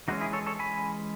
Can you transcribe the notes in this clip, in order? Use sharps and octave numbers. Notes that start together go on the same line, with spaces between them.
E3 G#3 C#4 D#4 F#4
E4 G#4
A4 C#5
A4 C#5
G#5 B5